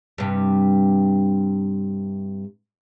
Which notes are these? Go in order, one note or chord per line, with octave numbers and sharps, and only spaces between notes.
G2 C3